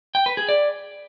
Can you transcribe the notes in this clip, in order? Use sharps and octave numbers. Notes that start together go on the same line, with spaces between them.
G5
B4
G#4
D5